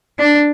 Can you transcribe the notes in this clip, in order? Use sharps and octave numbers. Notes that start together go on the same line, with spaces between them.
D4